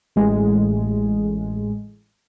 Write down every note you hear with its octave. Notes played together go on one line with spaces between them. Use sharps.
A1 A2 G#3